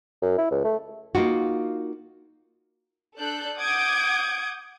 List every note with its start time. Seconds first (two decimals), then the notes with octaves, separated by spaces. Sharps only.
0.22 F#2
0.38 E4
0.51 C#2
0.65 A3
1.15 A#3 D#4 F4 F#4
3.17 D4 A4 F#6 G6
3.58 F#5 D6 D#6 G6 G#6 D7